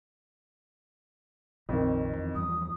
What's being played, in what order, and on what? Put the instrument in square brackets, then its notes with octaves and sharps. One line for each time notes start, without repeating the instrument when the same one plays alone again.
[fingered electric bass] A#1 C4 [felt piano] F2 D#3
[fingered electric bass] E2
[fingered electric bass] E2 G2 F3 [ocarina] D#6